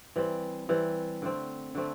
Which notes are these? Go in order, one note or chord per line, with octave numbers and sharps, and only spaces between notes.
E3 G3 C4
E3 G3 C4
D3 A3 C4
D3 A3 C4